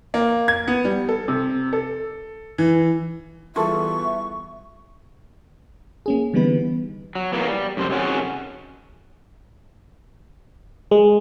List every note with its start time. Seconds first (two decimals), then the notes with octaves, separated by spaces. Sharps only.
0.14 A#3
0.48 G#6
0.68 B3
0.85 G3
1.09 A4
1.28 C3
1.73 A4
2.58 E3
3.56 E3 G3 B3 F4 G#4 A4 E5 C#6
6.06 A#3 C#4 G#4
6.33 D3 E3 G3 B3 D#4 B4
7.15 F#3
7.33 E3 F#3 A#3 B3
7.48 G3
7.77 F#2 C3 C5
7.89 C3 D#3 F#3 C#4 F#4 G#4
10.91 G#3